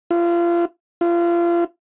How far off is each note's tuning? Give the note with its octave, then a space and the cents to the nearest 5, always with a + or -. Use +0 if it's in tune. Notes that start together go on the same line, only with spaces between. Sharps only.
F4 -30
F4 -30